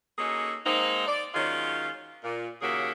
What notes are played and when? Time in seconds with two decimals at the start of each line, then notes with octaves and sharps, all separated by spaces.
0.19 A#3 C#4 D#4 F#4 G#4 A4
0.65 G#3 A#3 C4 D#4
1.07 D5
1.34 D#3 F#3 G#3 C#4 F4
2.24 A#2
2.62 D#2 C#3 F#3 A#3 G#4 E5